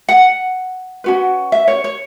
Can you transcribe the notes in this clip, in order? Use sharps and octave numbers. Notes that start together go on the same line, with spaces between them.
F#5
C#4 F#4 B4
E5
C#5
C#5